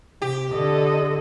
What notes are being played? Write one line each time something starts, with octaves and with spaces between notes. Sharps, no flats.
C3 G4
D3 A4 D#5